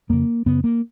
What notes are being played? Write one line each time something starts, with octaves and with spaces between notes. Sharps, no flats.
F2 C#3 A#3
F#2 C#3 B3
A#3